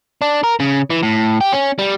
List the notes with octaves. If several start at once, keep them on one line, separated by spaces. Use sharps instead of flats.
D4
A#4
C#3
E3
A2
G4
C#4
G3